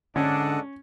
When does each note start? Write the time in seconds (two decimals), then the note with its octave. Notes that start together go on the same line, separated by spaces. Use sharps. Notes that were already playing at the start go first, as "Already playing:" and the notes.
0.16 C#2 G#2 D3 C#4 D4 A4 D#5 F#5